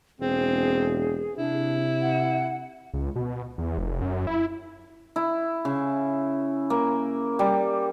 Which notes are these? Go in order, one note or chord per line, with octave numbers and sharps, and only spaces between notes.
E1 C4 G#4
C3 D4 E4
F#5
C#2
B2
E2
F1
F#2
E4
E4
C#3
A#3
G3